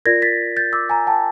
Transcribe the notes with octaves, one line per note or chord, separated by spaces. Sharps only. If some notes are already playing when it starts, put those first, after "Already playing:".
F4 A#4 D5 G#6 A#6
A6 B6
G6 A6
D6 E6
G#5 A#5
G5 A5